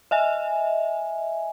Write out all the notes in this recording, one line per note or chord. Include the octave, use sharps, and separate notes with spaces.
D#5 E5 G#5